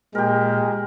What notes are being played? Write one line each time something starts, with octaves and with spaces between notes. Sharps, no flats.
A#2 G#3 G4 A#4